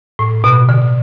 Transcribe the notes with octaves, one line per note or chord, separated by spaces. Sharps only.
A2
B2
D3